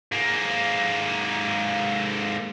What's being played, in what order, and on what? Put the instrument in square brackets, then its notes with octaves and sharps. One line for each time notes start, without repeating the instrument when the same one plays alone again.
[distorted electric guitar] G#2 A#3